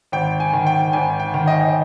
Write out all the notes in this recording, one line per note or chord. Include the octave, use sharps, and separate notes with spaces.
G#1 G5
G#5
D#3
G5
G#1 G#5
G5
D#3
D#5
D#5